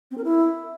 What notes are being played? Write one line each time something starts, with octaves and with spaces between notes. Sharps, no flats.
C4
A#4
E4